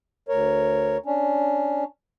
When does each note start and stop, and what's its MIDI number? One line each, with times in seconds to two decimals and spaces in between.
0.29 0.97 38
0.29 0.97 70
0.29 0.97 73
1.06 1.84 61
1.06 1.84 62